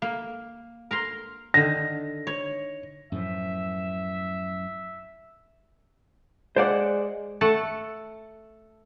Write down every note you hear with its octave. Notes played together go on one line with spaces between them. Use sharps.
A#3
A#4 A#5 C6
D3 D#3 A#6
C#5
F#2 A2 F3 E5
G#3 C5 D5 F#5
A3 A4 F#5 A5